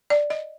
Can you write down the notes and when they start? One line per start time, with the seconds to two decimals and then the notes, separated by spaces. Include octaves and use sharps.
0.10 D5
0.30 D#5